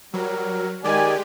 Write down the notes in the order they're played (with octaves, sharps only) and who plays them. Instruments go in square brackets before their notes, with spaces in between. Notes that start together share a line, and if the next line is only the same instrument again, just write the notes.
[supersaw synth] F#3 [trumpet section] G3 A#4
[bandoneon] D#3 D5 [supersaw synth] G#3 G4 [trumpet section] G#5